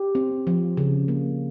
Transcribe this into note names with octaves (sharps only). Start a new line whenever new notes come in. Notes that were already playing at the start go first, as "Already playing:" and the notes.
Already playing: G4
C4
F3
C#3
A#3